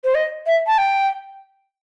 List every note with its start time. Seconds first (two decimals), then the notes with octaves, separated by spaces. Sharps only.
0.04 C5
0.14 D#5
0.46 E5
0.66 A5
0.78 G5